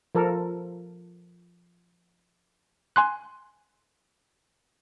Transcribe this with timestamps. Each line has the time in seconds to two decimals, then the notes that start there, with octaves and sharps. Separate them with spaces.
0.15 F3 A4 A#4
2.96 G#5 C6 F#6